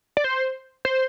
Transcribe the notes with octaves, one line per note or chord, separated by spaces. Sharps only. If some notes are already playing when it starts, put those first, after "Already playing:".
D5
C5
C5